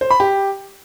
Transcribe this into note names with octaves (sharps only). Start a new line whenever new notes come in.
C5
B5
G4